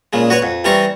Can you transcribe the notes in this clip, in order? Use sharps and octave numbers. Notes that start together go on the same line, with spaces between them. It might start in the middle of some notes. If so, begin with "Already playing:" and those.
A#2 C#3 G#3
F#4 B4 C#5
F2
E3 G3 C4 A#5 C#6